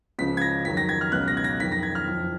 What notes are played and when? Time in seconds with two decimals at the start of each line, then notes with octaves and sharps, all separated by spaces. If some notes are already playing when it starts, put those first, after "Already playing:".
0.19 C#2 C#3 F3 B6
0.37 G#6
0.41 A#6
0.65 F2 D#3 F#3 B6
0.77 A#6
0.89 G#6
1.01 F6
1.12 C#2 B2 F#3 F#6
1.28 A#6
1.37 G#6
1.44 A#6
1.60 F2 D#3 F#3 B6
1.72 A#6
1.83 G#6
1.95 F6
2.06 F#1 F2 F3